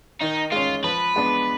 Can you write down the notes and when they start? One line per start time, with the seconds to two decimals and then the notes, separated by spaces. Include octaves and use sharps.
0.21 D#3 D#4
0.52 G#3 C#4 F4
0.84 F3 B4
1.16 G#3 B3 D4